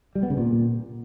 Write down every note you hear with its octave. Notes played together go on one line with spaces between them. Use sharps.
G3
B3
C#3
A#2